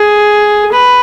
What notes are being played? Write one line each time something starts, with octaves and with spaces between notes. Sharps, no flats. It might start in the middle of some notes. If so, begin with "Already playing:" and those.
Already playing: G#4
B4